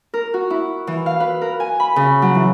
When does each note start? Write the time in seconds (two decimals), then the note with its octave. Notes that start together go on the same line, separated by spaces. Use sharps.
0.14 A#4
0.34 F#4
0.50 E4
0.87 E3
1.06 F5
1.20 B4
1.41 A#4
1.60 G#5
1.80 B5
1.96 C#3
2.22 F#3
2.35 E3